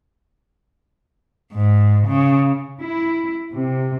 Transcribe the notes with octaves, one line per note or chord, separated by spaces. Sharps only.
G#2
C#3
E4
C3